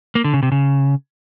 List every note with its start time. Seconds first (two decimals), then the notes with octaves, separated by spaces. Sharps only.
0.15 A#3
0.24 D3
0.34 C#3
0.43 C3
0.52 C#3